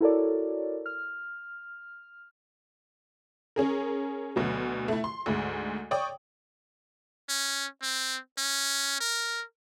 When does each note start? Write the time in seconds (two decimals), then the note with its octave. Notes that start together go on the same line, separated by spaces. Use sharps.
0.01 E4 F#4 A4 A#4 C#5 D5
0.86 F6
3.56 C#4 G#4 A#4
4.36 D2 B2 F#3
4.88 A3 E4
5.04 C6
5.26 D2 G#2
5.91 C#5 D5 G5 C#6 D#6
7.29 C#4
7.82 C4
8.38 C#4
9.00 A#4